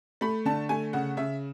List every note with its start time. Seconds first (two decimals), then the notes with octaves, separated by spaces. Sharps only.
0.21 A3 B5
0.45 D3 A5
0.69 A3 G#5
0.93 C#3 F#5
1.17 C#3 E5